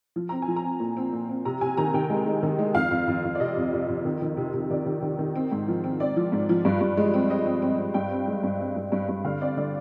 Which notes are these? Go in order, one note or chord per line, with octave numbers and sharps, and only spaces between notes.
F3
C4 A#5
G#5
F3
A#5
C4
A#2
C4
A#2
C4
C3 A#5
C3 G#5
D#3 A#5
D#3 G5
G#3
G#3
D#3
G#3
F2 F5
F2
F2
F2
D5
C3 D#5
F2
F2
F2
D#3
D#3
C3
C3
D#3 D5
D#3
D#3
D#3
C4
G#2
F3
C4
C4 D5
F3
G#2
F3
G2
G2
G#3
C4
C4 D#5
C4
C4
C4
G2 G5
C4
G#3
G2
C4
G2
G2
G2
D3 F5
C4 D5
D3 D5